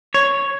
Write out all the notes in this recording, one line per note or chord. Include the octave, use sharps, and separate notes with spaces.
C#5